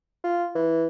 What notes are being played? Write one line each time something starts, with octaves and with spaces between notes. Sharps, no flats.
F4
E3